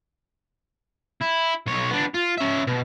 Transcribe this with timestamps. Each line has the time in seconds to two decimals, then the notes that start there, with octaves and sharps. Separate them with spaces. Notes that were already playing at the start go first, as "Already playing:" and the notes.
1.21 E4
1.66 B1 C#5
1.91 B3 D4
2.15 F4
2.38 C#4 E5
2.67 B2